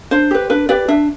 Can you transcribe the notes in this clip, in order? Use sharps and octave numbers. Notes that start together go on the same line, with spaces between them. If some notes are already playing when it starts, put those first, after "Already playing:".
D4 C5
G4 B4
D4 B4
G4 B4 D5
D4 E5